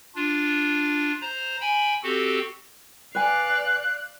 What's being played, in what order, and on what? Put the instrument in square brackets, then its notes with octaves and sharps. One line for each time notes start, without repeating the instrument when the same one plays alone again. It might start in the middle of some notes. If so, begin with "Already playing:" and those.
[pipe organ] D4 F4
C5 A#5
G5 G#5 B5
C4 F#4 G4 A4
[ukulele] B4 G#5 [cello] D5 F5 [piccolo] F#6